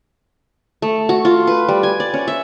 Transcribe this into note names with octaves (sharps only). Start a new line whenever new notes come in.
A3
F#4
F4
B4
G3
G#5
D5
C#4
E5